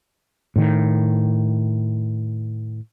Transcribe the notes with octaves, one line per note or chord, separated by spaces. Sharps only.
A2 D#3